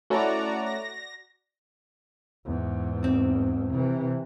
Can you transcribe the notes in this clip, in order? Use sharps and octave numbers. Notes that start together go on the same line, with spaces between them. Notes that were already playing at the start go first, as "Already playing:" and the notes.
A3 C#4 E4 F#4 D5 A#5
A#6
E2 G#2
C4
C3 E3